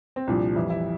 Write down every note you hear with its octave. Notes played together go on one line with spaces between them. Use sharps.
C4
C2 A#2 F3 D4
F2 E3 G3 E4
E4